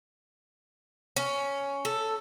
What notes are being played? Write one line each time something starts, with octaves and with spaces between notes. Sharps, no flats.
C#4
A4